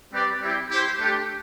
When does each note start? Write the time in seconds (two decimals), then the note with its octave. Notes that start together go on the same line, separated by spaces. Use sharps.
0.12 G3 C4 G4 B4 D5
0.41 G3 C4 E4 G4
0.70 E4 G4 C5
0.98 A3 D4 G4